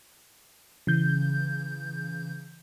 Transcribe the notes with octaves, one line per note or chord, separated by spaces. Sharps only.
C#3 E3 G6